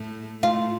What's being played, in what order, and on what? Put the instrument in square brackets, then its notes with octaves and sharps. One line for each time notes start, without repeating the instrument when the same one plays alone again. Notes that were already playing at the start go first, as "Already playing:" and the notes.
Already playing: [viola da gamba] A2 A3
[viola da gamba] A2 A3 [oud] F4